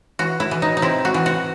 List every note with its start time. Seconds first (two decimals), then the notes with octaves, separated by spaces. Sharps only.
0.19 E3 F#4
0.40 E4
0.51 E3
0.62 D#4
0.77 D#4
0.82 C4 E4
1.05 F#4
1.14 E3
1.26 F#4